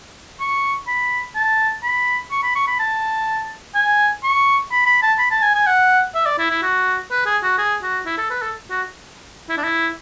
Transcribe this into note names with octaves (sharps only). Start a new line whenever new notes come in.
C#6
B5
A5
B5
C#6
B5
C#6
B5
A5
G#5
C#6
B5
B5
A5
B5
A5
G#5
G#5
F#5
E5
D5
E4
E4
F#4
B4
G#4
F#4
G#4
F#4
E4
A4
B4
A4
F#4
E4
D4
E4